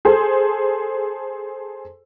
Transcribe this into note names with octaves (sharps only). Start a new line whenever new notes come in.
G#4 A4 C5